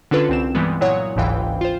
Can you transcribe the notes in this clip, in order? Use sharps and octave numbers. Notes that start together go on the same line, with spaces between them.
D3 C#4 D4 F4 A4 B4
C2 C4 E7
G2 E3 G3 G#3 B3
A#2 F#3 E4 C#5 F#5 D#6
G1 C#2 G#2 E3 F5 G5
F4 C5